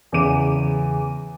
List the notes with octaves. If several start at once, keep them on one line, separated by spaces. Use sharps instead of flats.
E2 C#3 D6 D#7